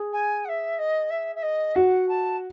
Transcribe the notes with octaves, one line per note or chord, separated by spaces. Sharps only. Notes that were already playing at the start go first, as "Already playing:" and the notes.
Already playing: G#4
G#5
F#5
E5
D#5
E5
E5
D#5
F#4 F#5
A5